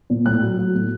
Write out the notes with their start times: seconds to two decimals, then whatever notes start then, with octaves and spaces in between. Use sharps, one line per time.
0.10 A#2
0.26 A2 F#6
0.42 F#3
0.58 F#3
0.74 A2